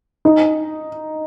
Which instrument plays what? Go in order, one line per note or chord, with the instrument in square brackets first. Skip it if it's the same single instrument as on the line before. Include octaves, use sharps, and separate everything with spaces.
[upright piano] D#4